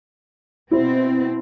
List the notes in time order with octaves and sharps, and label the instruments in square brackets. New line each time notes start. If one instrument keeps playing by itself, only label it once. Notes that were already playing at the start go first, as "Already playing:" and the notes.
[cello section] B2 C4 [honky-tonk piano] E4 C5